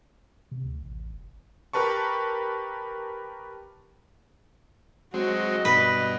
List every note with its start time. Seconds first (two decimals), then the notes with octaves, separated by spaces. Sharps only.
0.51 C3
0.64 D2
0.81 A1
1.10 F1
1.73 G4 A#4 B4 A5 C#6
5.14 F#3 G#3 C4 F#4 D#5
5.65 G2 B2 B4